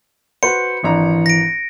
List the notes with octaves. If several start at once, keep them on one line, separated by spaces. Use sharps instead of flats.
F#4 B4 C5 C#7
G#1 E3 D4 A#5
A#6 D7